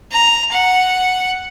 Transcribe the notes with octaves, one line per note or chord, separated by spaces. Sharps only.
A#5
F#5